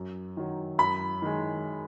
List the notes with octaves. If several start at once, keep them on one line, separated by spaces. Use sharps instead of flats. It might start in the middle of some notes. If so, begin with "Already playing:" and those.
Already playing: F#2
D#3 F#3
F#2 B5
D#3 G#3